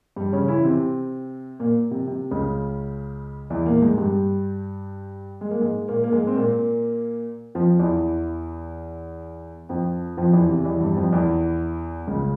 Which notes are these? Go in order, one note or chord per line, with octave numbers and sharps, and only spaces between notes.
G2 G3
C#3 C#4
E3 E4
C3 C4
A#2 A#3
C3
C3
C#2 C#3
E2 E3
A#2 A#3
G#2 G#3
G2 G3
G#3
A#3
G#2 G#3
A#2 A#3
A#3
G#2 G#3
C4
A#2 A#3
F2 F3
E2 E3
F2 F3
F2 F3
E2 E3
C3
E2 E3
G2 G3
F2 F3
E2 E3
C#2 C#3